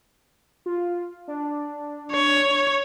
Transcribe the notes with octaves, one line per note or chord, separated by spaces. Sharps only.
F4
D4
C#5